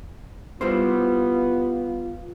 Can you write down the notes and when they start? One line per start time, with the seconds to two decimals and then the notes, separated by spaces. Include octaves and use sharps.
0.61 G3 B3 E4 F4 C5